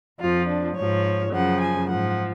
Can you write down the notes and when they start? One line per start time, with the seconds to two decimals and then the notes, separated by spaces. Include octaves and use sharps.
0.20 F2 F3 F4
0.48 D4
0.76 G#2 F3 C#5
1.33 F#2 C#3 F3 F#5
1.61 G#5
1.90 G#2 F3 F#5